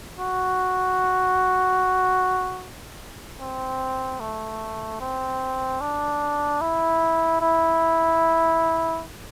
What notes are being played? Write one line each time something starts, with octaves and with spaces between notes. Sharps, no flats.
F#4
C4
A3
C4
D4
E4
E4